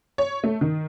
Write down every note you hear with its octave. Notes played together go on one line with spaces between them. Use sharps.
C#5
A3
D#3